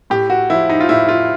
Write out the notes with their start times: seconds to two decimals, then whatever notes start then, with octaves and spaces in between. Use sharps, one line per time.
0.10 A2 G4
0.30 F#4
0.50 F3 E4
0.70 D#4
0.81 F4
0.89 A2 E4
1.09 F4